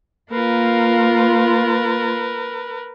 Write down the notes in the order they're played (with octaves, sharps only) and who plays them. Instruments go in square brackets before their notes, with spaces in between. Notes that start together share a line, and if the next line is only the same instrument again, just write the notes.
[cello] A#3 F4 [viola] A#4 B4